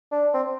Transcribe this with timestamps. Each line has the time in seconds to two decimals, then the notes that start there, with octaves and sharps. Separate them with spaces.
0.12 D4
0.34 C4